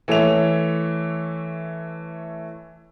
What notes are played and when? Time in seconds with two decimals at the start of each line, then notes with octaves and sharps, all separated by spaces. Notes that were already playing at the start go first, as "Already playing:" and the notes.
0.08 E3 A3 C#5 E5 F7